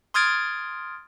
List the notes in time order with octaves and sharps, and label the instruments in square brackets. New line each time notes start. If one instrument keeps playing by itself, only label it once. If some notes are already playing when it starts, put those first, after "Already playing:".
[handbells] C6 D#6 F6 G#6 A6 D7